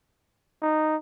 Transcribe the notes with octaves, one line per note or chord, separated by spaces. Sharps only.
D#4